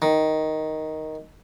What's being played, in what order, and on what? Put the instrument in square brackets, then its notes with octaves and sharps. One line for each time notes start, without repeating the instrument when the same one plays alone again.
[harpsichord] D#3